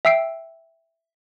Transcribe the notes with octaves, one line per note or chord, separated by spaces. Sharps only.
E5 G5 E6 C7 D7